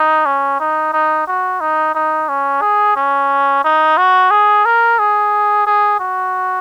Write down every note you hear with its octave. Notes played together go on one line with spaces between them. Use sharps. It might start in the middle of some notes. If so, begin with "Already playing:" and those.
Already playing: D#4
C#4
D#4
D#4
F#4
D#4
D#4
C#4
G#4
C#4
D#4
F#4
G#4
A#4
G#4
G#4
F#4